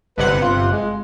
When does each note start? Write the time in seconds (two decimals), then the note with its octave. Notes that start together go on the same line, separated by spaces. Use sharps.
0.18 G1 C3 B4 F#5
0.42 F4
0.72 G#3